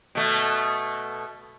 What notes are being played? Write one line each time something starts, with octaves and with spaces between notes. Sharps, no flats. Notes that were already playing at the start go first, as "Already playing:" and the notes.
B2 A3